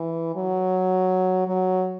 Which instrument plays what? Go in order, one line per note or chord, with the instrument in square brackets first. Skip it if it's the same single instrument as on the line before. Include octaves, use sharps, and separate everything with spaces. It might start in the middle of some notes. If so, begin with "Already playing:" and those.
Already playing: [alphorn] E3
F#3
F#3